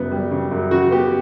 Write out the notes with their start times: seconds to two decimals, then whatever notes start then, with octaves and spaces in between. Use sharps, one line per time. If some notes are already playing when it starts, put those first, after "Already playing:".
Already playing: F#2 C#3 G3 B3
0.12 G3
0.31 C#3
0.51 F#2
0.71 C#3 F#4
0.91 B3 G4